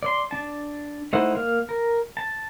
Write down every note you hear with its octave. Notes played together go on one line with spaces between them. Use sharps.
D5 C6
D4 A5
A3 D#4 E4 C5 F#5
A#3 F5
A#4
A5